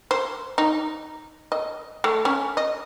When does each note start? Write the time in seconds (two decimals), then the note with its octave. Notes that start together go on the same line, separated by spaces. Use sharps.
0.11 C5
0.58 D#4
1.52 D#5
2.04 A3
2.25 C#4
2.57 D#5